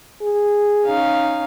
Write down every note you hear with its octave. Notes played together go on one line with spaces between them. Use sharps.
G#4
C#4 D#4 F5